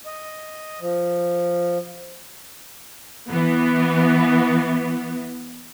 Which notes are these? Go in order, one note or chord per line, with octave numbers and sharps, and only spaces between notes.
D#5
F3
E3 B3